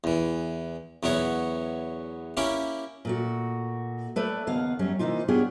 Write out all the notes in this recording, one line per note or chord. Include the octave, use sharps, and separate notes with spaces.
E2 E3
E2 F#3 B3 E4 C#5
A#3 C#4 E4 G4
A#2 A3 F#4
A3 B4 D5 E5
D#2 C#3 B3 F5
F#2 F#3 G3 C#4
C3 E3 A#3 D#4 F4
B3 D4 F4 G4 G#4 C#5